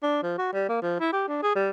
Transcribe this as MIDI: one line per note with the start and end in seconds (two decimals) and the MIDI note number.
0.03 0.23 62
0.23 0.34 53
0.38 0.49 66
0.53 0.66 55
0.69 0.80 58
0.82 0.98 53
1.00 1.11 64
1.12 1.23 67
1.28 1.41 62
1.42 1.55 68
1.56 1.70 55